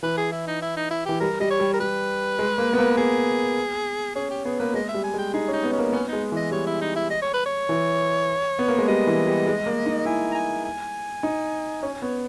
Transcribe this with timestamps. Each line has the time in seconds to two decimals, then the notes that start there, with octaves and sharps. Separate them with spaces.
0.03 E3 B4
0.17 G#4
0.32 E4
0.48 D#4
0.62 E4
0.77 D#4
0.91 E4
1.06 E3 G4
1.20 G3 A#4
1.40 G3 D#5
1.51 C#5
1.60 G3
1.73 A#4
1.80 G3 B4
2.39 G#3
2.58 A#3
2.73 B3
2.78 A#3
2.97 B3 G#4
4.15 C#4 G#4
4.31 G4
4.45 B3 G#4
4.60 A#3 B4
4.74 G#3 D#5
4.89 E5
4.94 G3
5.04 G#5
5.14 G#3
5.19 G5
5.34 D#4 G#4
5.48 C#4
5.53 D#4
5.63 B3
5.73 C#4
5.78 A#3
5.93 B3 C#4
6.08 G#3 D#4
6.32 E3
6.37 D#5
6.51 G3 C#5
6.67 E4
6.82 D#4
6.96 E4
7.10 D#5
7.22 C#5
7.34 B4
7.46 C#5
7.69 E3
8.59 B3
8.68 A#3
8.78 G#3
8.88 G3 D#5
9.07 E3
9.27 G3
9.47 G#3
9.66 A#3
9.86 D#4
10.05 E4 G#5
10.32 A#5
10.35 G#5
10.65 G#5
11.23 D#4
11.83 C#4 G#5
12.02 B3 C#5